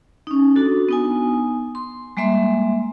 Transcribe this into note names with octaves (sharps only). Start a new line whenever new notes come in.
C#4 D#4
D4 F#4 A4
B3 D#4 G#5
C6
G3 G#3 A#3 E5 C6